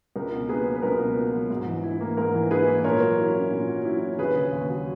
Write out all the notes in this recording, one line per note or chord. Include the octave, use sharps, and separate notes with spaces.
C#2 A#4
B2
A#3 G#4 B4
F#3
B4
C#2 A#4
B2
A#3
F#3
G#2
E3
E4
A#3
G#2 A#4
E3
E4 G#4 B4
A#3
A#2 A#4 C#5
F#3
E4
C#4
A#2
F#3
E4
C#4
D#2 G#4 B4
C#3
D#2
F#3